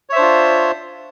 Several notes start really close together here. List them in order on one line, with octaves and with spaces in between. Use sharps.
C#5 E5 C5 D4 F4